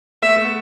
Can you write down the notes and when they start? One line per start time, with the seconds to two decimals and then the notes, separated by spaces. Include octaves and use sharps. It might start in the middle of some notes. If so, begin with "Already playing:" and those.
0.22 A3 E5
0.37 A3
0.45 B3